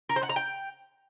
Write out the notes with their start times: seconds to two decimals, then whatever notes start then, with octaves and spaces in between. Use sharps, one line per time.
0.09 A#4
0.16 C5
0.23 F#5
0.29 A#5
0.36 G5